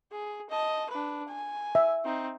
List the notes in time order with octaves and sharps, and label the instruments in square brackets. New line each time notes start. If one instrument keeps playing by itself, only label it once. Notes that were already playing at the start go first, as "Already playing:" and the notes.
[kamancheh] G#4
D#5 A5
D4 B4
G#5
[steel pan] E5
[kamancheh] C4 D#4